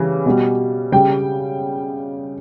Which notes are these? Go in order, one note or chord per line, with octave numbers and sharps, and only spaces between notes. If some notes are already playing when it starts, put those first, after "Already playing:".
Already playing: C#3 E3 G3
B2 G3
C#3 G3 G5